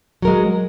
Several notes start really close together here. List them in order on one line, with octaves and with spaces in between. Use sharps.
F#3 A#4 G#3